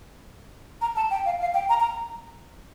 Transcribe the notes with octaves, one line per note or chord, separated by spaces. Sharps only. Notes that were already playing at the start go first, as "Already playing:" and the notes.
A#5
A5
G5
F5
F5
G5
A#5
A#5